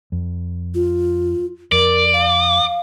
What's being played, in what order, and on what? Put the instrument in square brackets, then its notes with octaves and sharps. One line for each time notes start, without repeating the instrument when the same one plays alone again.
[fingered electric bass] F2
[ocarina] F4
[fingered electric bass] F2 [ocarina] A#4 [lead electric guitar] D5
[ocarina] F5